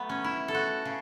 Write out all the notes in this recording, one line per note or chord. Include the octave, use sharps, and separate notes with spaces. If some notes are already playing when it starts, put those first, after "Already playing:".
Already playing: F#3 A3 B3
C#4
E4
A4
F#4
C#3